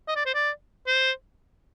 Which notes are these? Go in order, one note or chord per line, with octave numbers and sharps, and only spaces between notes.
D#5
D5
C5
D5
C5